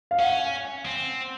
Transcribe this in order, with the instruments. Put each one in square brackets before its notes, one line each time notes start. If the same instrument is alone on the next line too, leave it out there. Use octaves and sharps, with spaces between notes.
[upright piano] F5
[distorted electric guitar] C#4 [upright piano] F#5
[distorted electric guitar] C4